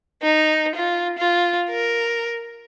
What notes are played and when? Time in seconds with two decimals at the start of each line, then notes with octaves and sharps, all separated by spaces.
0.22 D#4
0.76 F4
1.18 F4
1.69 A#4